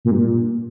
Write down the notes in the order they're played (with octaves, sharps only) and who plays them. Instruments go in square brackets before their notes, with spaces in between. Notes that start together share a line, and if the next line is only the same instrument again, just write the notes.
[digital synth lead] A#2
G2
A#2